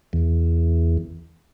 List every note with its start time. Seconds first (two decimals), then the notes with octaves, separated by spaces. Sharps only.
0.13 E2